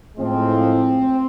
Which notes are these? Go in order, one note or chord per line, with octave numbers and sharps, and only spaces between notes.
A2 F3 G#3 C4